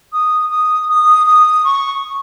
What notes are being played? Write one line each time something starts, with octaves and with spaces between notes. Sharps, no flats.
D#6
D#6
D#6
D#6
C#6